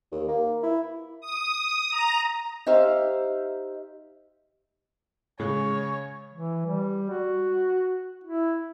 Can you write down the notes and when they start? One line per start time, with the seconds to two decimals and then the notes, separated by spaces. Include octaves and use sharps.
0.12 D#2
0.28 A#3
0.63 E4
1.21 D#6
1.90 A#5
2.66 D#4 G4 C5 E5 F5
5.40 A2 C#3 G#3 G#4 C#5 F#6
6.33 E3
6.65 G3
7.10 F#4
8.24 E4